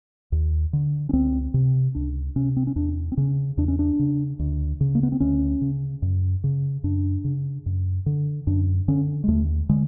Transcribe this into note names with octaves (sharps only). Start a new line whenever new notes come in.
D#2
D3
C#4
C#2 C4
C3
C#2 D4
C3 C#4
C4
C#4
E2 D4
C4
C#3 C#4
E2 D4
C#4
D4
C#3
D2
C#3
A#3
B3
C4
D2 C#4
C#3
F#2
C#3
F#2 D4
C#3
F#2
D3
F#2 D4
D3 C#4
G#3
D#2 A3
D3 G#3